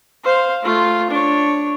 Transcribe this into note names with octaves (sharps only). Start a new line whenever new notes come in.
C5 F5
A3 F4
D4 C#5